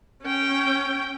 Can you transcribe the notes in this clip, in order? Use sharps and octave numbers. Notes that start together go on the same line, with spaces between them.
C#4 G5